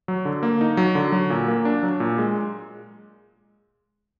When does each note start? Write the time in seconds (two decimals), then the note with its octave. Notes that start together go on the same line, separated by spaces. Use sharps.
0.08 F#3
0.25 D3
0.43 A#3
0.61 D#4
0.77 F#3
0.95 D3
1.12 F#3
1.30 A#2
1.48 A#3
1.65 D4
1.83 F#3
2.00 A#2
2.18 G#3